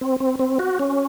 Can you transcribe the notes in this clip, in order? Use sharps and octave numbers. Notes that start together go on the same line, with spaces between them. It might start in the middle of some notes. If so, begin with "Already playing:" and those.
C4
C4
C4
F#4
C#4